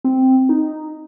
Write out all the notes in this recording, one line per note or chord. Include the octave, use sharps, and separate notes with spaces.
C4
D#4